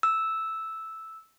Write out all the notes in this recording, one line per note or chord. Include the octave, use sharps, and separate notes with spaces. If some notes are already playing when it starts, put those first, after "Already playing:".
E6